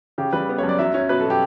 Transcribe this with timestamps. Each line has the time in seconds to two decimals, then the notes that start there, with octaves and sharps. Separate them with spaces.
0.18 C#3 G4
0.33 G3 B4
0.49 B3
0.58 C#5
0.63 F#2
0.69 D5
0.79 F#3 E5
0.94 C#4
1.09 B2 B4
1.20 A4
1.26 B2 G4